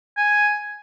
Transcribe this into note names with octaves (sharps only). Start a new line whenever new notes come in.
G#5